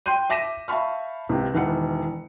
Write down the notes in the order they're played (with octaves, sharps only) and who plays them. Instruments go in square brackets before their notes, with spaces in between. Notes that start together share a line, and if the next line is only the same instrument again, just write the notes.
[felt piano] G5 C6 F#6 G6 D#7
E5 D6 A#6 B6 D#7 E7
E5 F5 A5 B5 C#6 F6
C#2 C3
E1 D#3 E3 F#5 F#6 C#7